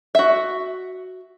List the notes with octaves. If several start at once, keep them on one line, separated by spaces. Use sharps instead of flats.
F#4 E5